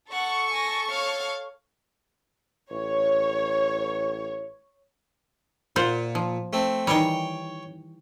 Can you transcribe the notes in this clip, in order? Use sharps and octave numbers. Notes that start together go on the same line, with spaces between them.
A4 F#5 C#6
G#5 A#6
C#5 F5
A1 C#5
A#2 F4 C5 F#5
F3
A3 C4
D#3 E3 G3 C#5 G5